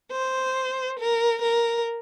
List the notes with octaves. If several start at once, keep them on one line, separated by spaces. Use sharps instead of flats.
C5
A#4
A#4